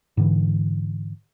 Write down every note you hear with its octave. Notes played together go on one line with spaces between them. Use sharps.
G#2 D3 E3